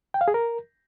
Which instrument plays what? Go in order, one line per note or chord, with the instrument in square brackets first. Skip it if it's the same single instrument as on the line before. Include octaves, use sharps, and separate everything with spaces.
[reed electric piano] G5
F5
G#4
A#4